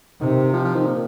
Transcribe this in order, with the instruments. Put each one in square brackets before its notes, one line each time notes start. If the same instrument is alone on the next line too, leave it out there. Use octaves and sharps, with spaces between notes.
[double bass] C3 [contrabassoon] D#3
[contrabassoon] F3
F3
D#3
A#2